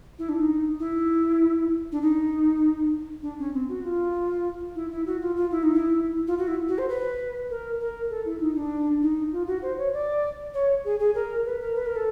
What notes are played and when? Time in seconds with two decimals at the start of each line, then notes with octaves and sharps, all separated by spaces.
0.19 E4
0.29 D4
0.39 D#4
0.80 E4
1.92 D4
2.02 D#4
3.23 D4
3.39 C#4
3.54 C4
3.69 F#4
3.84 F4
4.75 E4
4.91 E4
5.06 F#4
5.21 F4
5.36 F4
5.51 E4
5.63 D#4
5.74 E4
6.27 F4
6.38 F#4
6.48 E4
6.68 F#4
6.78 C5
6.89 B4
7.50 A#4
7.80 A#4
8.10 A4
8.25 E4
8.41 D#4
8.56 D4
9.02 D#4
9.32 F4
9.47 F#4
9.62 C5
9.78 C#5
9.93 D5
10.54 C#5
10.84 G#4
11.00 G#4
11.15 A#4
11.45 B4
11.61 A#4
11.76 B4
11.86 A#4
11.96 A4